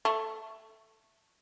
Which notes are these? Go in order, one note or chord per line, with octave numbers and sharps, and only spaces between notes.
A3